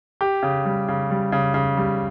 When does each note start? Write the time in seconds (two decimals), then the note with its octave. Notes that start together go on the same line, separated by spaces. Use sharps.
0.21 G4
0.43 C#3
0.65 G3
0.88 C#3
1.11 G3
1.32 C#3
1.54 C#3
1.77 G3